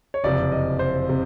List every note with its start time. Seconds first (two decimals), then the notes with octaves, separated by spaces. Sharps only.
0.14 C#5
0.24 F#1 F2 C3 D5
0.52 D#5
0.79 C5
1.09 C3